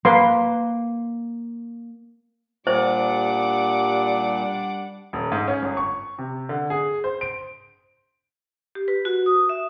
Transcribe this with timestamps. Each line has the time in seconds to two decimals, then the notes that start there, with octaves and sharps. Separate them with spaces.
0.05 A#3 B4 C6
2.67 A#2 G3 D4 C5 F#5 D6
5.13 D#1
5.32 G#2
5.48 C#4
5.62 G1
5.77 C#6
6.18 C3
6.49 D3
6.70 G#4
7.04 C5
7.21 D7
8.75 G4
8.88 B4
9.05 F#4
9.26 D#6
9.49 E5